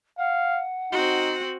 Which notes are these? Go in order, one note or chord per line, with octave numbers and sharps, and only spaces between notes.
F5 F#5
C4 D#4 F#4